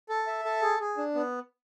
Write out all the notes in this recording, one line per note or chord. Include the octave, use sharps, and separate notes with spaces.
A4
E5
A4
G#4
G#4
D4
B3